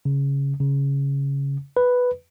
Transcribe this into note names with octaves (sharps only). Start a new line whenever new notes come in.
C#3
C#3
B4